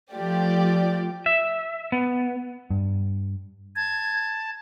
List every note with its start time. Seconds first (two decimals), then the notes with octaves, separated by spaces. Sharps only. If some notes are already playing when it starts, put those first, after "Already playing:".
0.13 F3 A3 F4 G4 D5
1.26 E5
1.92 B3
2.70 G2
3.76 A5 G#6